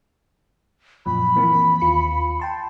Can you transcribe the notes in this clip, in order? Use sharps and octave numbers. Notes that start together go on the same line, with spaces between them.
F#2 A#2 F3 B5
E3 A#3 C4
D#2 F4 C#7
G5 A5 C6